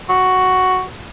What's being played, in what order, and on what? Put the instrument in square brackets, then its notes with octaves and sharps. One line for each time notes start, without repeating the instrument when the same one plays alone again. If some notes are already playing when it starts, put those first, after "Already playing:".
[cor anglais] F#4